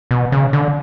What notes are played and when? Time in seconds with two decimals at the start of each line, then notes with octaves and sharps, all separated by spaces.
0.11 B2
0.32 C#3
0.53 D3